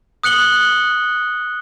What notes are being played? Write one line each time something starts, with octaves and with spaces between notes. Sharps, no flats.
D#6 F#6 C#7 F#7 G7